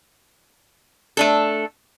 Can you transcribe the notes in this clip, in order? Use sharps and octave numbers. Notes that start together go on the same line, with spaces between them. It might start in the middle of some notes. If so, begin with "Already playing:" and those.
A3 D4 A4